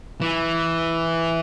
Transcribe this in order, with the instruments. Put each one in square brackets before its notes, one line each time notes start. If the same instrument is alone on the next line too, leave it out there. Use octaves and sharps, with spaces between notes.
[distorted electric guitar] E3